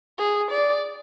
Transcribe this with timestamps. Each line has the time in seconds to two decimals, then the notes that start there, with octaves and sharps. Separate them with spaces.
0.19 G#4
0.51 D5